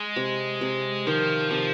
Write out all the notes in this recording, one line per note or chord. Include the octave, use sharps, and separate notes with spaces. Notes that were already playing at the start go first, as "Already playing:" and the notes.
Already playing: G#3
C3
C3
D#3 F3
C3 F3